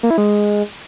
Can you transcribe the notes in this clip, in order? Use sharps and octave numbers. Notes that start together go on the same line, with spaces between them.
A#3
E4
G#3